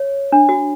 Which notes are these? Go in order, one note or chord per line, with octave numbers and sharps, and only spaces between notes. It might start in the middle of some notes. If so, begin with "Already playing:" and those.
Already playing: C#5
D4
F#4